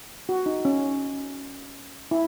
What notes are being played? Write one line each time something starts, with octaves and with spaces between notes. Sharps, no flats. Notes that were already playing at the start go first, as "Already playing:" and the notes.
F#4
D#4
C#4
E4